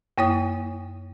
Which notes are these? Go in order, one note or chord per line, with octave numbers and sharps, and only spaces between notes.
F#2 A#3 E4 C#5 G5 D#6